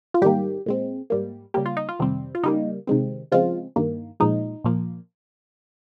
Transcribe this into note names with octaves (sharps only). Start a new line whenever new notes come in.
F4
G#2 D#3 G3 A#3 G4
A#2 G#3 C4
G#2 G3 A#3
C#3 G3 A#3 G4
F4
D#4
F4
F2 C3 D#3 G3 C4
F4
C#3 G3 A#3 D#4
C3 D#3 G#3 C4
C#3 F3 G#3 C4 F4
G2 D#3 A#3
A#2 F3 G#3 D#4
A#2 F3 A#3